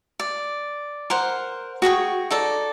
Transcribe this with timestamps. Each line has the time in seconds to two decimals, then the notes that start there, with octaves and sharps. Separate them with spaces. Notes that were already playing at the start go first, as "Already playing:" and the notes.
0.20 D5
1.10 A#4 C5 F#5
1.82 F#4 G#4 G5 C#6
2.31 D#4 A4 D5